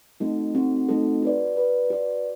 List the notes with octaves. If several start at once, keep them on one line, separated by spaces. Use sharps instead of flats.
A3 C4 D#4 F#4 A4
A3 C4 D#4 F#4 A4
A3 C4 D#4 F#4 A4
F#4 B4 D5
F#4 B4 D5
F#4 B4 D5